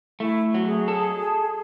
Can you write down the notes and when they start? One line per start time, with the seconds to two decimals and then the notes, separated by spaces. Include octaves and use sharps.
0.20 A3 E4
0.54 F#3
0.66 G#4
0.88 A4